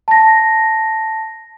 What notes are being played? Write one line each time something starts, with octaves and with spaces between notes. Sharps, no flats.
A5 A#6